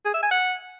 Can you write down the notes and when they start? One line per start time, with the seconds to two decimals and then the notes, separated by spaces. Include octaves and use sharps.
0.05 G#4
0.14 E5
0.22 G#5
0.31 F#5